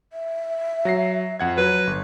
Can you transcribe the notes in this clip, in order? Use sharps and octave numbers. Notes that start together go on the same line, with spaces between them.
E5
F#3 A#6 C7
F2 F#5 G#6
F#3 B4
G1